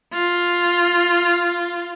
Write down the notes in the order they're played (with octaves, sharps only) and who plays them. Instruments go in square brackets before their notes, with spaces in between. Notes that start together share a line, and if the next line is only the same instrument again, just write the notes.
[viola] F4